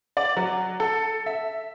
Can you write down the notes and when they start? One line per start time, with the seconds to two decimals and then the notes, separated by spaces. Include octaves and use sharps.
0.17 D5
0.37 F#3
0.80 A4
1.26 E5